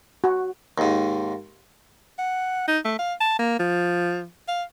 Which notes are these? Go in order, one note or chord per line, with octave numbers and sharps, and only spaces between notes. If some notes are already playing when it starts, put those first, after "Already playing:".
F#4
D#2 G#2
F#5
D#4
A3
F5
A5
A#3
F3
F5